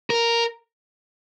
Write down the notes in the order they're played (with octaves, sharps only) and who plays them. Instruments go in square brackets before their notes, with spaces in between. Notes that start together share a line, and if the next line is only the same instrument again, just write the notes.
[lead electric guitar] A#4